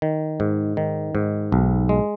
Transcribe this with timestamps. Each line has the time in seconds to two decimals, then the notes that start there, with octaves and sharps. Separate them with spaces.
0.02 D#3
0.40 G#2
0.77 D#3
1.15 G#2
1.52 B1
1.89 G#3